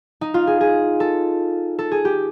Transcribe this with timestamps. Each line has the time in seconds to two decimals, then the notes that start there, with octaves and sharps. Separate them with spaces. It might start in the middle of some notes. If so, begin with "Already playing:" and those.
0.21 D#4
0.34 F4
0.47 G#4
0.61 G#4
1.00 A4
1.79 A4
1.91 G#4
2.05 G4